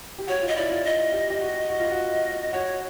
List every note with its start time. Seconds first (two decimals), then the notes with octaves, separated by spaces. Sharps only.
0.18 G4
0.28 F#4 C#5
0.42 F4
0.48 D#5
0.56 E4 D5
0.70 F4
0.84 E4 D#5
1.12 G4
1.30 G4
1.41 F#4
1.69 F#4
1.80 F4
1.91 F#4
2.53 F#4 C#5